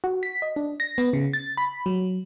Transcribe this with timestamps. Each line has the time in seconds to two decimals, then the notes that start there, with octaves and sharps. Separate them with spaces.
0.04 F#4
0.23 B6
0.42 D#5
0.56 D4
0.80 A#6
0.98 B3
1.13 C#3
1.33 A6
1.57 B5
1.86 F#3